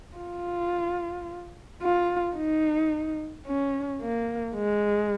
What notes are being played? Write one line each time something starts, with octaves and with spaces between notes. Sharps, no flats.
F4
F4
D#4
C#4
A#3
G#3